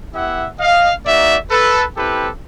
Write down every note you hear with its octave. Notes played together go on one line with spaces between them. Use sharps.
B3 E4 G4 E5 F#5
D#5 F5
A#3 D#4 F#4 D5 E5
A4 B4
C4 E4 G4 A4 B4